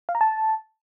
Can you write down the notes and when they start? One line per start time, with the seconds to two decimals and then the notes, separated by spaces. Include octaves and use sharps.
0.09 F5
0.15 A#5
0.21 A5